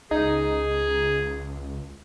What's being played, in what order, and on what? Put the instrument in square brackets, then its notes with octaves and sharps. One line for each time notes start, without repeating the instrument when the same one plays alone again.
[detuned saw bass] C#2 [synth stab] D#4 [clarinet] G#4